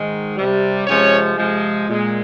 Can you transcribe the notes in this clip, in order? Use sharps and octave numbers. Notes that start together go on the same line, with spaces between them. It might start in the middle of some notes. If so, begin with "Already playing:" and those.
Already playing: G#2 D#3 G#3
C3 G3
C3 F3 G#3 C#4 C#5
C3 F3 G#3
A#2 G#3